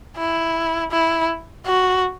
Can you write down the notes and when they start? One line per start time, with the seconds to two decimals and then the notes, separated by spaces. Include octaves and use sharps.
0.17 E4
0.91 E4
1.66 F#4